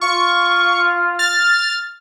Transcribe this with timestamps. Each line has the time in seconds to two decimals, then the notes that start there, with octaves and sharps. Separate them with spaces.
0.01 F4 C#6
1.19 F6 A6